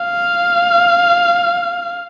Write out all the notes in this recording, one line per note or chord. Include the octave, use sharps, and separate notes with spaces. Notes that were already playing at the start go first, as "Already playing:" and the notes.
Already playing: F5